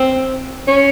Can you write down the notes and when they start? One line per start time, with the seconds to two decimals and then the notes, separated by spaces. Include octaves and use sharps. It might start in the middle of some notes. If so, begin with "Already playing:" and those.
Already playing: C4
0.68 C#4